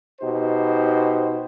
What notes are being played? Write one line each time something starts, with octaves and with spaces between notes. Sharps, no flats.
B2 D#4 G4 C5